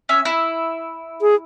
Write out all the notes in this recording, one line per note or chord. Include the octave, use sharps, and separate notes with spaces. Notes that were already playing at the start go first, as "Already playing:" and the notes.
C#4 E5
E4
G#4